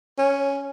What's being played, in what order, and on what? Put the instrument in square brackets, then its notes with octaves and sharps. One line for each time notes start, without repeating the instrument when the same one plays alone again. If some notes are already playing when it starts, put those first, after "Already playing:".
[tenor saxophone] C#4